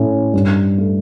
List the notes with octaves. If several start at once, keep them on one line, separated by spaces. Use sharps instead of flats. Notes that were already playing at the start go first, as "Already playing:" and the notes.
Already playing: A2 C#4
G2
A3